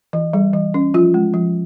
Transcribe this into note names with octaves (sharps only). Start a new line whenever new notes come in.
E3
G3
E3
C#4
F3 F4
G#3
F3